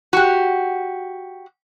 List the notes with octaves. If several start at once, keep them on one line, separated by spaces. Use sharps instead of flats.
F#4 G4